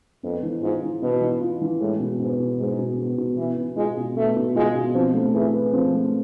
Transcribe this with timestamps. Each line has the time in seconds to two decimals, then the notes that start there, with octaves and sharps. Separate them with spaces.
0.23 F2 B3
0.43 E3
0.62 G#2 F4
0.83 E3
1.02 B2 B3
1.21 E3
1.41 F4
1.61 E3
1.80 A2 G#3
2.00 B2
2.19 G#2 B3
2.39 B2
2.58 G#2 G#3
2.79 B2
2.98 B3
3.18 B2
3.37 E3 B3
3.57 B2
3.76 G#3 F4
3.97 B2
4.16 A3 B3
4.36 B2
4.55 G#3 F4
4.75 B2
4.94 F3 C4
5.14 A3
5.34 E3 G#4
5.53 B4
5.73 F3 C4
5.93 A3